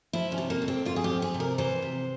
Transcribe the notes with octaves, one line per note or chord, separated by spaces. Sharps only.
F3 E4
C#4
C3
A#3
F2
C4
F2 F4
G#4
G4
F3
G#4
C3
A#4
E3 C5
C3